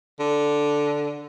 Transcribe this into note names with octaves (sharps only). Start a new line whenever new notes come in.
D3